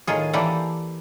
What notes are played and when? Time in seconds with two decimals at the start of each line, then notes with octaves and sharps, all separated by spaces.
0.07 A2 D#3 F4 G#4
0.33 E3 A#3 E4 G4 A4 D5